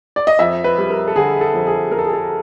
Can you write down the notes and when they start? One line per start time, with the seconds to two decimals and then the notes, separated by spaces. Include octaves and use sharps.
0.16 D5
0.27 D#5
0.39 F2 E5
0.64 B4
0.78 G3
0.90 A#4
1.08 A4
1.16 D3 G#4
1.41 A4
1.54 F2
1.67 G#4
1.91 F2 A#4
1.99 A4
2.06 G#4
2.13 A4